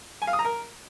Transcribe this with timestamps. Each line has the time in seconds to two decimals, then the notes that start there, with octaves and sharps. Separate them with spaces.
0.22 G#5
0.27 F5
0.33 D#6
0.39 A#5
0.45 A#4